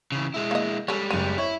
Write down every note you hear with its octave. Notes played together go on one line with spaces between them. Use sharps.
C#3 E3
G#3 E4
A#3 D#5
G3 G#3 C#4 A4
F#1 C4 D#7
E4 C#5